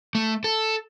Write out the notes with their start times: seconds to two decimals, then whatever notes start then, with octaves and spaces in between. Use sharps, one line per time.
0.15 A3
0.44 A4